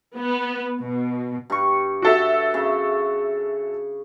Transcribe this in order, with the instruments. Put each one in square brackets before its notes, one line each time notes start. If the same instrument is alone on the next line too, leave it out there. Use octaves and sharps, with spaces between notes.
[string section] B3
B2
[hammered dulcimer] G2 C#6
[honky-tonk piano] F#4 A4 E5
[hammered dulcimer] C#3